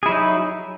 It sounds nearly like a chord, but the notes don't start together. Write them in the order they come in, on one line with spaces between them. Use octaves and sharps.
G#4 E4 F#3 D#4